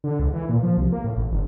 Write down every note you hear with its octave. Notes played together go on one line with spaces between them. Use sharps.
D3
C#2
E3
A#2
F3
C2
A#3
A2
A1
G1